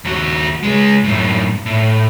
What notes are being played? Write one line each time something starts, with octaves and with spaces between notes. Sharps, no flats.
D#2 F#4
C#2 G#3
F#2 A2
A2